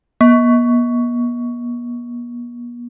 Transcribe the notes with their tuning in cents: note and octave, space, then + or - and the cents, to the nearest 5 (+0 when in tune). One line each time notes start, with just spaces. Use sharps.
B3 -45